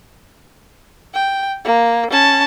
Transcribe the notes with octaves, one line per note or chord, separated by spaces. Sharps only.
G5
A#3
C#4 A5